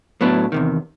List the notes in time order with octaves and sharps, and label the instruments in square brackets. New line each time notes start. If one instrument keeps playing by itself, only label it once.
[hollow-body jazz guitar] A2 F#3 B3 D4
E2 C3 D#3